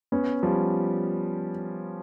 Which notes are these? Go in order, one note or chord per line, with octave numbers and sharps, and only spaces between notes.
B3 C#4
F3 G3